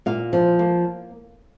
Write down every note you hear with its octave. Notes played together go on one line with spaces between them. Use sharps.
A#2 F5
F3
A#3